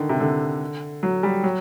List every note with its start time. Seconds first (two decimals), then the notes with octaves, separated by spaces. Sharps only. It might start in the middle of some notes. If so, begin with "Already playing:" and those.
Already playing: D3 D#3
0.09 C3
0.20 D3
1.03 F#3
1.23 G3
1.43 F#3